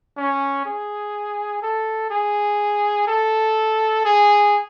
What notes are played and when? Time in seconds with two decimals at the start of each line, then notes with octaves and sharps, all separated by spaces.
0.17 C#4
0.66 G#4
1.63 A4
2.11 G#4
3.08 A4
4.05 G#4